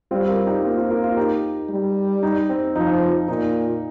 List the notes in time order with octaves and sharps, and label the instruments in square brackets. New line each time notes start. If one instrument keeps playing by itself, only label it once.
[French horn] G3 [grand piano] C4 F4
[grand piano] F4 A#4
D#4 G4
[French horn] A#3 [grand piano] C4 F4
[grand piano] C4 F4
F4 A#4
F4 A#4
D#4 G4
[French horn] G3
[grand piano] D#4
C4
[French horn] F3 [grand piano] D#4
[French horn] A#2 [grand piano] D#4